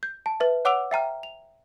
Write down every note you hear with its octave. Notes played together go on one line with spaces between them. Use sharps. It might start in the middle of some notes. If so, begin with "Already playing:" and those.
G6
A5
B4 E5
C#5 F#5 D6 E6 D7 F7
E5 G5 A#5 F6
F7